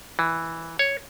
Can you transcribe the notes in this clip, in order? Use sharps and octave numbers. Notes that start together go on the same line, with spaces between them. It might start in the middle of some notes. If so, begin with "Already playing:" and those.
E3
C#5